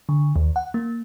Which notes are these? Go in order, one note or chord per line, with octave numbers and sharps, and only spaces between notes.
D3
D#2
F#5
A#3